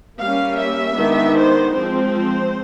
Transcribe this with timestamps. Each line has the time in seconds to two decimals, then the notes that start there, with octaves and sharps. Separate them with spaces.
0.19 G3 A#3 C#4 F5
0.58 E5
0.96 D#3 G#3 B3 D4
1.36 C5
1.74 F3 G#3 C4 C5